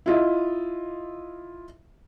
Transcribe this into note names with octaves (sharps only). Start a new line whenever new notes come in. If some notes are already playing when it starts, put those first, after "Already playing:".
E4 F4 D#5 E5